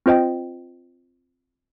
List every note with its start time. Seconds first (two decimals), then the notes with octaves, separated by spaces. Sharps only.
0.06 C4 F4 C5 D#5 G5